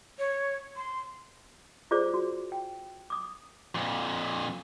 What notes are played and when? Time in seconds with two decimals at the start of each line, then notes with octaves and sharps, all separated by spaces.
0.19 C#5
0.76 C6
1.91 F4 G4 G#4 C5 D5 D6
2.14 F#4
2.52 G5
3.10 D6 D#6
3.75 F2 A#2